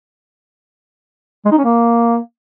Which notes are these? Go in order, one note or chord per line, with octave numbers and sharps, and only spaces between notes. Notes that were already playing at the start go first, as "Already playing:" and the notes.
G#3
D#4
C#4
A#3